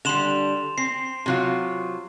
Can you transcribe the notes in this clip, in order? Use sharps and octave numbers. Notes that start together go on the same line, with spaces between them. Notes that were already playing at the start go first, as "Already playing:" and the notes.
D3 G3 C6 E7 F7
C4 C7
C3 F#3 F4